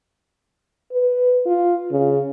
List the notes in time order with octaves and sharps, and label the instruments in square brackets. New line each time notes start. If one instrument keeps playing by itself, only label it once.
[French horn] B4
F4
C#3